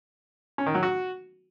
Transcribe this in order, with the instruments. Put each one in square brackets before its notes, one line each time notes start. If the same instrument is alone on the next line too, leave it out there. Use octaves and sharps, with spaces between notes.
[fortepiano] C#4
D#3
F#3
F#4